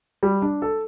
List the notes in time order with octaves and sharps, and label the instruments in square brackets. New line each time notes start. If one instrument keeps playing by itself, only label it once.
[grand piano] G3
D4
A4